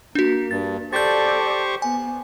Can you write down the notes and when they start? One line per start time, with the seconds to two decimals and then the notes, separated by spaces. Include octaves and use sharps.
0.15 A#3 D4 F#4
0.51 G2 A6
0.93 G4 A4 C5 D5 C#6 G6 A6
1.82 B3 G#5